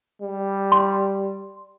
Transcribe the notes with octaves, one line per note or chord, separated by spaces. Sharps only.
G3
C6